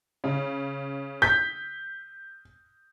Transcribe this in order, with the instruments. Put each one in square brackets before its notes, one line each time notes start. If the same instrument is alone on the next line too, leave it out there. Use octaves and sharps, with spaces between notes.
[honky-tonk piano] C#3
[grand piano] G6 [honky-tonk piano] B6